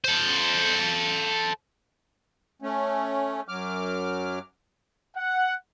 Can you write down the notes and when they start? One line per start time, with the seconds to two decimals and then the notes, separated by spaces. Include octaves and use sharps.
0.04 A4 C5
2.62 A3 C#4
3.48 F#2 F#3 D6 F6
5.16 F#5